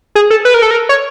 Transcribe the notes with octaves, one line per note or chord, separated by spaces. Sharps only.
G#4
A4
B4
A#4
A4
A#4
C#5